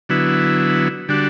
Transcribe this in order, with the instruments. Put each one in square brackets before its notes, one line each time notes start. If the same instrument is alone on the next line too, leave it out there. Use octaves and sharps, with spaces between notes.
[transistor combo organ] D3 F#3 B3 E4
D3 G3 D4 F#4